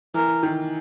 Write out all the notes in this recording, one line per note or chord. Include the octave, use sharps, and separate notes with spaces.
E3 A#4
D#3